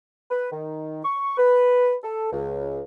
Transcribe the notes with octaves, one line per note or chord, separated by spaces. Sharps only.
B4
D#3
C#6
B4
A4
C#2